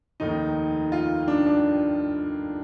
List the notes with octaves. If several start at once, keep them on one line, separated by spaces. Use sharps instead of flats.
F1 D#2 D#3 D#4
F4
D4
D4